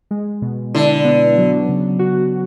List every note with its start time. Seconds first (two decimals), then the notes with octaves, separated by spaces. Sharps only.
0.11 G#3
0.42 B2
0.74 D3 E4
1.05 B3
1.37 F#3
1.69 C#3
1.99 F#4